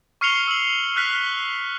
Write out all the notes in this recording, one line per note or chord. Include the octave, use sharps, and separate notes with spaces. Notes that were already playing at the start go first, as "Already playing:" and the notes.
C#6 F6 C7 C#7 F7 G7
E6 F#7
F6 F#6 B6